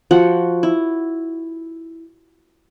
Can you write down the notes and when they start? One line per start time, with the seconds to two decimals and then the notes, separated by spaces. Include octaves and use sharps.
0.11 F3 F#4 F#5
0.63 E4